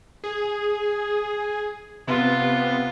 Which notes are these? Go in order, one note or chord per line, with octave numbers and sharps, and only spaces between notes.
G#4
C3 B3 F4